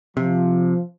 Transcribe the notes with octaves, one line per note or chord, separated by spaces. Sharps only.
C3 F3